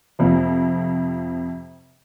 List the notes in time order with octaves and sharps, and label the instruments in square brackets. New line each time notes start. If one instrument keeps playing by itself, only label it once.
[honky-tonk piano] F2 C3 F3